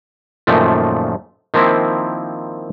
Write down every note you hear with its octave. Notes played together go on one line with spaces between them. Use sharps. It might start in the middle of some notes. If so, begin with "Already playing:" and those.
F#2 A#2 D#3 F3 A3
D#3 F3 A#3 C4 E4